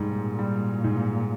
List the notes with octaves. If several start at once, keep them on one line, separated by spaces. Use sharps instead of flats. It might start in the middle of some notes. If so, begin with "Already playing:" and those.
Already playing: G#2 G3
A#2
G3
G#2